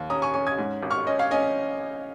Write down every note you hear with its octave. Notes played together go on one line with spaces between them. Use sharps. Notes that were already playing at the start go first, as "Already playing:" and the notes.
Already playing: D#2
C#4 A#5 D#6
G#5 C#6
C#4 G#5 C#6
D#6 G#6
G#2
G#1
C#6 F6
C#4 D#5
C#5 F5
C#4 D#5 G#5